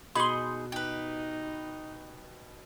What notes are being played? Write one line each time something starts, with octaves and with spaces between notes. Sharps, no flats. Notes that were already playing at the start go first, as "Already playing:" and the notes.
B2 D#4 G#4 B5 C6
D#4 G4 B4